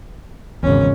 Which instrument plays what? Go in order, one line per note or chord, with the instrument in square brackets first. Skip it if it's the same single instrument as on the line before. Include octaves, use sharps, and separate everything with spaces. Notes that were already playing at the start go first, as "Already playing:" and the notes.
[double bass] G#1 C#4 [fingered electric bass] E2 C#3